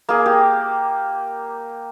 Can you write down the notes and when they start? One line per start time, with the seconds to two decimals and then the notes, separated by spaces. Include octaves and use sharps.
0.09 A#3 G#4
0.26 G4